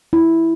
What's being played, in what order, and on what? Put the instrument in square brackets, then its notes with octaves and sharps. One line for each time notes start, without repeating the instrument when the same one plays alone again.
[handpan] E4